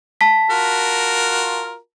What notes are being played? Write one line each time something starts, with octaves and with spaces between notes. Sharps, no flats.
A5 B6
F4 F#4 A#4